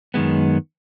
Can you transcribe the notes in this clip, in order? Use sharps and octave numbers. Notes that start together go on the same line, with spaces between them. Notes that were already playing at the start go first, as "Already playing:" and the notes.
F#2 D#3 G#3 B3